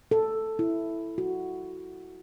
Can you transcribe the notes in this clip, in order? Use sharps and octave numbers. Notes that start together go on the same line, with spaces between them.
A4
E4
F#4